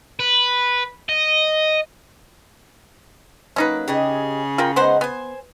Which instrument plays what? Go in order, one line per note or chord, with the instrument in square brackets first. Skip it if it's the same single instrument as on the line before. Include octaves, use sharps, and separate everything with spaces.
[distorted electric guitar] B4
D#5
[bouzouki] F#3 A#3 [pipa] C#4 D#4 B4
[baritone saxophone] C#3 [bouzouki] G4 G#4 D#5
[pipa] F4 A#4 G5
[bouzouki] G#3 D#4 F#5 [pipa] B3 C5
[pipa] B3 [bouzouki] C5 G#5